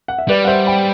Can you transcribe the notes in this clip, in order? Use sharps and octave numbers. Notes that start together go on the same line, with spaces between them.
F#5
E5
G3 B4 D5
F#5
C5 E5
G5 B5